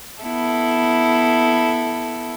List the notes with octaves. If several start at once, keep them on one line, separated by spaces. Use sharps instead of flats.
B3 E4 A4